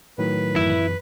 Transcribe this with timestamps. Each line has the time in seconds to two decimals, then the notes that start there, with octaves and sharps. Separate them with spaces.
0.18 A2 D#3 F#3 B4
0.56 F#2 E3 E4